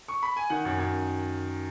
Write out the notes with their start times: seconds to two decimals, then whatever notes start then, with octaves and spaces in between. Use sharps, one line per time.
0.08 C#6
0.23 B5
0.36 G#5
0.50 D#3 F#5
0.65 F#2
0.78 F#2